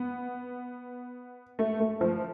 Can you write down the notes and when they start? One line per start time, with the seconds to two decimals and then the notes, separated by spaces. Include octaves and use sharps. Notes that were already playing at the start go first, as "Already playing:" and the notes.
Already playing: B3
1.59 A3
1.80 A3
2.01 F3